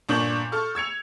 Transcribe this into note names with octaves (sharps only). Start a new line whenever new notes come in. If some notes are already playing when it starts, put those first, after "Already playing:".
G1 A#2 D4 C#6 G6 F#7
A4 C#6 F6
E6 G#6 C#7 F7